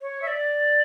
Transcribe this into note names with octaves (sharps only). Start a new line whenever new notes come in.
C#5
E5
D5